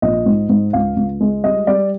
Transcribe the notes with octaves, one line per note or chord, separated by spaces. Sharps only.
A#1 D#5
G#2
G#2
C#2 F5
C#2
G#3
G3 D#5
G3 D5